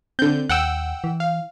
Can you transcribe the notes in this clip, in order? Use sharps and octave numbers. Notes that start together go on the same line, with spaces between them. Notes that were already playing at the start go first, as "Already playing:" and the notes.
D3 C4 G6
D#2 F#5 G5 E6
E3
F5